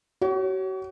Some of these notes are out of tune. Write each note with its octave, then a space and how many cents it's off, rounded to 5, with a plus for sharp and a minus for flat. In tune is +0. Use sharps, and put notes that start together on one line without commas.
F#4 +40 C#5 +0